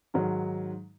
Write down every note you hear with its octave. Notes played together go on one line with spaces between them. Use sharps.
G#2 D#3 F#3